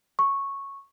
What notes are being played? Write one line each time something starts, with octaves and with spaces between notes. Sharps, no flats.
C#6